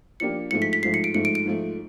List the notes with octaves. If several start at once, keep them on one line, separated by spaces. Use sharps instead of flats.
F3 A#3 D4 G4 C#7
G#2 F3 A3 C#7
B6
B6
G#2 F3 A3 C7
C#7
D7
G#2 F3 A3 C#7
D7
D7
G#2 F3 A3